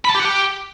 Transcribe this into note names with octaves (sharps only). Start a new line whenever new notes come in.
B5
A5
G4
F#5
G4